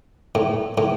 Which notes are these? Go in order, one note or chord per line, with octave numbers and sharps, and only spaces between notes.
A2
A2